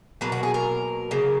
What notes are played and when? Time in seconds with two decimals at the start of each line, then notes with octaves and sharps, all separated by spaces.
0.21 B2 F#3 A#3 B4
0.32 F#4
0.43 G#4
0.54 A#4
1.11 C#3 F#3 A#3